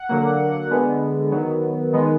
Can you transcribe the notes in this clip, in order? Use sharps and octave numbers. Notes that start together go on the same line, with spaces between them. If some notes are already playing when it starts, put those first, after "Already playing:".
Already playing: F#5
D3 F#3 A#3
D3 G#3 B3
D#3 F#3 B3
D#3 G#3 B3